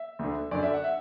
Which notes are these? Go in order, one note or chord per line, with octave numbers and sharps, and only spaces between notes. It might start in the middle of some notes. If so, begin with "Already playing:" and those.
Already playing: E5
D2 D3
F#2 D3 D5
E5
F#5
E5